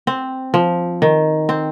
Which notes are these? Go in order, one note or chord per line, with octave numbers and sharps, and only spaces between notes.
C4
F3
D#3
C4